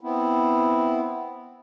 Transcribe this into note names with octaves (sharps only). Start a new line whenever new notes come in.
B3 C4 E4